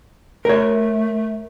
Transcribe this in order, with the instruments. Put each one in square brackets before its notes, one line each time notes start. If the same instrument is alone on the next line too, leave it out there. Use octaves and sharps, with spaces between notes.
[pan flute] A3 [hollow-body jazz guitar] A#4 C#5